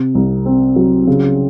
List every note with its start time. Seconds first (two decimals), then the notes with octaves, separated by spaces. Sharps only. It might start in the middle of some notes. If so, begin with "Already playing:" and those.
Already playing: C3
0.15 C2
0.46 C4
0.76 F#3
1.07 C#3